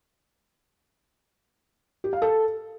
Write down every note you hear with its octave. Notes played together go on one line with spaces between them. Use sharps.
G4
F5
A4